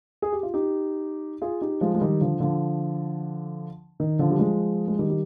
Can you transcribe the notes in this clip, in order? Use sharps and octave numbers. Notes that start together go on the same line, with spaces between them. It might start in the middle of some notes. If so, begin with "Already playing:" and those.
G#4
G4
F4
D#4 G4
F4 G#4
D#4 G4
F3 G#3
G#3
D#3 G3
D3 F3
D3 F3
D#3
D3 F3
G3
F3 G#3
G#3
D#3 G3
G3